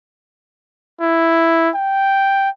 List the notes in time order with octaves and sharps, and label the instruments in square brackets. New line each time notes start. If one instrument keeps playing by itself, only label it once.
[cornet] E4
G5